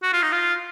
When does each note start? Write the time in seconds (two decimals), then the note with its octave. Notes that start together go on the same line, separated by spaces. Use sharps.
0.02 F#4
0.13 F4
0.22 D#4
0.32 F4